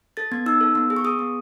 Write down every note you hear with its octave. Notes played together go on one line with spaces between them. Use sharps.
A4 A6
B3 G#6
D#4 E6
A4
B3
G#4
C#6
G#4 D#6
B3